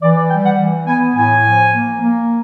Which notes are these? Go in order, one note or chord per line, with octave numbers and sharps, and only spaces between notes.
E3 D5
D5
G3 G5
F#5
E3
B3 G#5
A2 G#5
F3
A#3
A#3